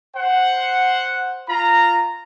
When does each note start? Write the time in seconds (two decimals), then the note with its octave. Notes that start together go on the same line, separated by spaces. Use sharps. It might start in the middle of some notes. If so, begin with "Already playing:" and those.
0.15 C5 F#5
1.49 F4 A#5